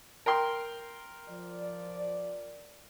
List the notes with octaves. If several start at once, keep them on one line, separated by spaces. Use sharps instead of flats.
A#4 G5 C6
F3 D5